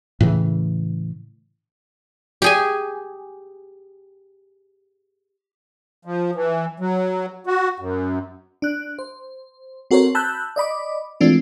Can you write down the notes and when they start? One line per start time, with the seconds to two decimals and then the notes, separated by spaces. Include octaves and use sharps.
0.21 A2 C#3 E3
2.42 G4 G#4 G#5
6.05 F3
6.35 E3
6.80 F#3
7.46 F#4
7.80 F#2
8.62 D4 F#6
8.99 C5
9.91 C4 F#4 A4 A#4 C5 C#5
10.15 A5 B5 E6 F#6 G6
10.56 D5 D#5 B5 D6
11.20 E3 G#3 A3 C4 D4 F4